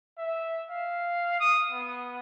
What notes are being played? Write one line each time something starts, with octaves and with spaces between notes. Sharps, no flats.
E5
F5
D#6
B3